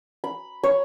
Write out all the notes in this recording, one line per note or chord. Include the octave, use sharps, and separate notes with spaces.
B5
C#5